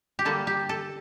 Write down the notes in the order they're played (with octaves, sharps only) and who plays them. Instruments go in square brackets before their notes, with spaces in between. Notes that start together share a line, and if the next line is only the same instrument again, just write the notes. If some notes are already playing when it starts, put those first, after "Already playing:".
[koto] G4
D3 G3 A#3 A4
G4
A4